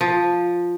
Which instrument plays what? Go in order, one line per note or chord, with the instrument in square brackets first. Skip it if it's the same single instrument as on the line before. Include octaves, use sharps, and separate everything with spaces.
[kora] F3